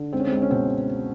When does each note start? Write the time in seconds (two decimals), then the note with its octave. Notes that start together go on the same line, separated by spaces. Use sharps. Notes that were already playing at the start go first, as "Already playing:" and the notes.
Already playing: D3
0.13 C#2 C4
0.20 C#4
0.27 C4
0.32 C#2
0.42 C#4
0.50 B2 C4